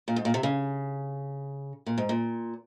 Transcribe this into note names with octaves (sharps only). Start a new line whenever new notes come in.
A#2
G#2
A#2
C3
C#3
A#2
G#2
A#2